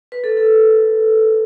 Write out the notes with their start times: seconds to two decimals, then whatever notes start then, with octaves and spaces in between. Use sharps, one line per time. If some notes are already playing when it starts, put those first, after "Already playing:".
0.12 B4
0.24 A4
0.37 A4